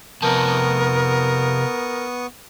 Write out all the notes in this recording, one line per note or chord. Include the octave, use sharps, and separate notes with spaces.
C3 F3 B3 A#4 A5 C#6 D#6